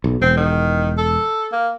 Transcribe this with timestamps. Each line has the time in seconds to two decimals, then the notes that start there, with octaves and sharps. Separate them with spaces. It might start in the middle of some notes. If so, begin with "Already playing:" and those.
0.04 B1
0.22 E1 C4
0.37 D#3
0.97 A4
1.52 A#3